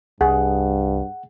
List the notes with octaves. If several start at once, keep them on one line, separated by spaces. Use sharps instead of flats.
C2 G2 G#4 F#5